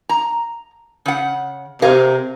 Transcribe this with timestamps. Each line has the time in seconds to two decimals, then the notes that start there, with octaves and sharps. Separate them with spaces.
0.09 A#5
1.06 C#3 F#5
1.82 C3 G#4 A#4 F5